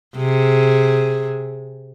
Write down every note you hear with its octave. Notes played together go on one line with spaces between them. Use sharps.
C3 G#4